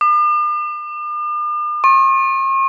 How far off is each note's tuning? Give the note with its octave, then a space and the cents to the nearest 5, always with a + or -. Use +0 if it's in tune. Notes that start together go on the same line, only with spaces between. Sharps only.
D6 +45
C#6 -45